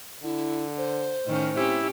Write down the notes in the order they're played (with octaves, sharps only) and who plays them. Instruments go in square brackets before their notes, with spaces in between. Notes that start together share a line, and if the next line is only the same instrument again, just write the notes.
[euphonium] D3 [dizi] E4
[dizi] C5
[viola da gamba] A2 D#3 C#4
[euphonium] C4 [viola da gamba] C#4 G4 [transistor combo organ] E4